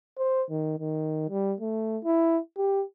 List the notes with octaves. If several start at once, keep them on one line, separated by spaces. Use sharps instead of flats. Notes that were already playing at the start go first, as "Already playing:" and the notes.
C5
D#3
D#3
G3
A3
E4
G4